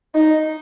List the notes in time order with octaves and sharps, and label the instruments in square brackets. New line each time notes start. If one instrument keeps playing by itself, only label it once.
[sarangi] D#4